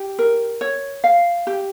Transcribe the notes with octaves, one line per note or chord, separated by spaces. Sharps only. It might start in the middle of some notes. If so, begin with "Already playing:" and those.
Already playing: G4
A#4
C#5
F5
G4